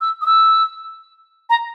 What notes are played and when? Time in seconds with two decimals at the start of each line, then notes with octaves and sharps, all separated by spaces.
0.01 E6
0.22 D#6
0.26 E6
1.50 A#5